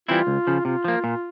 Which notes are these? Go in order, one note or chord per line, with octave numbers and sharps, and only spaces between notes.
E3 G3 C4 E4 F4
C#2
C#3 F3
C3 F4
F3 A#3
A#2